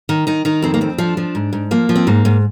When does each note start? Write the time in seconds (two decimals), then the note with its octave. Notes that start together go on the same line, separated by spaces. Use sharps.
0.09 D#3
0.27 D#3 D#4
0.45 D#3 D#4
0.62 F2 C4
0.74 A#3
0.81 F2 C4
0.98 F3 D4
1.17 F3
1.35 G#2
1.53 G#2
1.71 F3 A#3
1.89 F3
1.95 C4
2.07 G#2 A#3
2.25 G#2